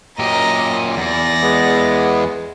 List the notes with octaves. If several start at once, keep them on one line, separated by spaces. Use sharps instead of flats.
F#2 A#2 G4 D#5 A#5
E2 D5 A#6
G#3 B3